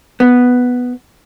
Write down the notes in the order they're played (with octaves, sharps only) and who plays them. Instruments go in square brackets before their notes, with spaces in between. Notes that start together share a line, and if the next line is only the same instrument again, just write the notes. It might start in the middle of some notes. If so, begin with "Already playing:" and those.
[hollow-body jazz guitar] B3